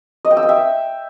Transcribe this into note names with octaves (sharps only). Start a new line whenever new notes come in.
D#5
G5
E6
G5
E5